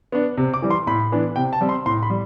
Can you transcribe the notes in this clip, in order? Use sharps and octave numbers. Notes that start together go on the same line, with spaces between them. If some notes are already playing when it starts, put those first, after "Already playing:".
B3 D4
C3
D6
E3 G3
C6
A2 B5
E3 B3 D4
C3 G5
A5
G3 C4
C6
A2 C6
B5
G3